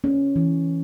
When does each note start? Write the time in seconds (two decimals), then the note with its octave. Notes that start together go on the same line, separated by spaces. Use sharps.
0.04 C#4
0.36 E3